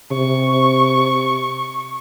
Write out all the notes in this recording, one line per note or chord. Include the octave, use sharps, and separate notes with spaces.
C3 C#6